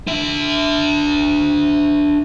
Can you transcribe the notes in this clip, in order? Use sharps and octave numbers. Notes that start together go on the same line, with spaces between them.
D4 E5